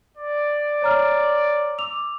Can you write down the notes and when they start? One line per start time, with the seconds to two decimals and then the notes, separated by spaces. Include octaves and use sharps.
0.18 D5
0.82 C#5 A#5 F6
1.78 D6 E6 F7